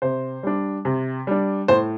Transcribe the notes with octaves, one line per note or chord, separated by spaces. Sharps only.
C3 C5
G3 D4
C3
G3 D4
A2 C5